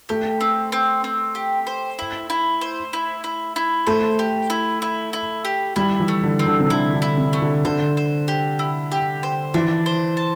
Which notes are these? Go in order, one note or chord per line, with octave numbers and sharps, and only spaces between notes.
A3 G4
C4
C4
C4
G4
C5
E4
E4
C5
E4
E4
E4
A3 C5
G4
E4
E4
E4
G4
G3 E4
E3
A3
D3
C4
D3
C3
D3 E4
D3
E4
C3
A3
D3
D3 C5
C5
G4
E4
G4
C5
E3 D4
C5
A5